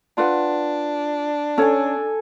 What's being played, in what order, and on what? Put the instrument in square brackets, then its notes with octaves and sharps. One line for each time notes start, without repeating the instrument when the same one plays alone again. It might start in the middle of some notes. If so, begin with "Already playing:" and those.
[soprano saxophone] D4 [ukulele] F4 B4 F#5
[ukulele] C#4 C#5 [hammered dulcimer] A4 G#5